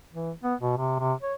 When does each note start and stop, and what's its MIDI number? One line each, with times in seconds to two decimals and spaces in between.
0.13 0.31 52
0.44 0.55 59
0.61 0.75 47
0.77 0.95 48
0.99 1.14 48
1.22 1.34 73